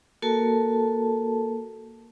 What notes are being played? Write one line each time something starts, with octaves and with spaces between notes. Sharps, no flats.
A#3 F#4 A4 A#4 A5